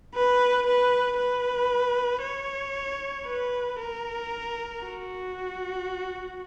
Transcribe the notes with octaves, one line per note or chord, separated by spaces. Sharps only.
B4
B4
B4
C#5
B4
A#4
F#4